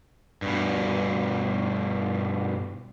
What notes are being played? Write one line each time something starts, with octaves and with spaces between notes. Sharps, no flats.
G2 B2